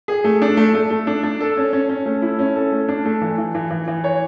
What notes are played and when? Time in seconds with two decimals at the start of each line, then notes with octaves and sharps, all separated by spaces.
0.08 G#4
0.24 A3
0.42 D4
0.57 A3
0.75 A3
0.90 A3
1.07 D4
1.23 D4
1.41 A4
1.57 C#4
1.73 C#4
1.89 C#4
2.06 A3
2.22 E4
2.39 C#4
2.55 A4
2.72 A3
2.88 D4
3.05 A3
3.21 E3
3.38 E3
3.55 E3
3.70 E3
3.88 E3
4.04 C#5